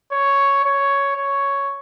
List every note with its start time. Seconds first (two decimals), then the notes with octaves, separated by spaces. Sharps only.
0.12 C#5
0.64 C#5
1.17 C#5